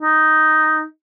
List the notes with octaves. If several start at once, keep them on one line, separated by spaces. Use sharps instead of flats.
D#4